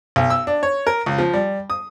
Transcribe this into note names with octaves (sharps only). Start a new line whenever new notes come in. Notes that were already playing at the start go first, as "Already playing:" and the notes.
B1
E6
D4
C#5
A#4
C#2
F3
G3
D#6